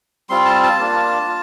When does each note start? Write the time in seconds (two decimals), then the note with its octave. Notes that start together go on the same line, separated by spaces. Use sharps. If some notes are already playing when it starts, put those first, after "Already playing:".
0.29 G3 C4 F4 C6
0.46 A5
0.63 A5
0.79 A#3 D4 F4
1.27 F4